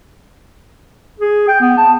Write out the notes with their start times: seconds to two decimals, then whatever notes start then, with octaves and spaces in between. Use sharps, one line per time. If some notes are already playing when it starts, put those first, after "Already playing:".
1.20 G#4
1.48 G5
1.61 B3
1.78 A5